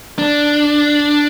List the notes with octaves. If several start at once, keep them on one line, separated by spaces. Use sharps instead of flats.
D4